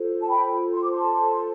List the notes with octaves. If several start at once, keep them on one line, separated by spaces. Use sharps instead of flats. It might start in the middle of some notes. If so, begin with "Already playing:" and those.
Already playing: F4 A4 C5
A5
G5 B5
C6
D6
A5 C6